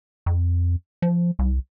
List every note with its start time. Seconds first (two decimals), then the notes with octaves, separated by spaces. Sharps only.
0.26 F2
1.02 F3
1.39 C2